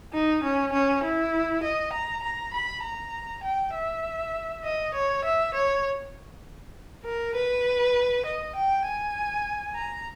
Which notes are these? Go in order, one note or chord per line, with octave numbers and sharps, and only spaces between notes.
D#4
C#4
C#4
E4
D#5
A#5
A#5
B5
A#5
G5
E5
D#5
C#5
E5
C#5
A#4
B4
D#5
G5
G#5
A#5